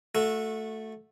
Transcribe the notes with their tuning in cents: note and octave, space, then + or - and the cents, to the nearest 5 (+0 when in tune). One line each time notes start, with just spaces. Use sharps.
A3 +0 F#4 -25 A4 +0